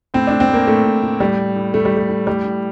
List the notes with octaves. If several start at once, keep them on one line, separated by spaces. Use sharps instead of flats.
A2 C4
A2 D4
C4
A2 A#3
A2 A3
A2
A2
A2 G3
A2
A2
A2 A3
G3
A2
A3
A2
A2 G3
A2